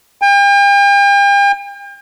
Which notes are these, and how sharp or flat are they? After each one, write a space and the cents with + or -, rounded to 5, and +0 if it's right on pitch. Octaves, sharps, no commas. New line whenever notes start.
G5 +40